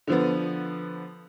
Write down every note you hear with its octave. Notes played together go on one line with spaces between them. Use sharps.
D3 F3 B3